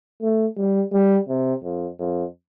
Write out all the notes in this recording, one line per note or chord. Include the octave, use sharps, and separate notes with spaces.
A3
G3
G3
C3
F2
F2